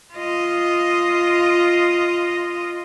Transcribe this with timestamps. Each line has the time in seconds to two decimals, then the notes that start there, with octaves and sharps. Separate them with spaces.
0.14 F4 D#5